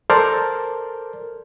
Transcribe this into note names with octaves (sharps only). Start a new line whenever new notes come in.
A4 A#4 C5 D5 F6